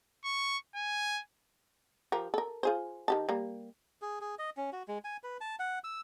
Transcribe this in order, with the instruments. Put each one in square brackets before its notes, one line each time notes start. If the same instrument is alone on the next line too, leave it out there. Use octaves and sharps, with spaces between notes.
[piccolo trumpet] C#6
G#5
[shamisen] F3 G4 A#4
A4 A#4
F4 G#4 C5
D#3 G4 A5
G3 A#3
[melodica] G#4
G#4
D#5
C#4
F#4
G#3
G#5
B4
A5
F#5
E6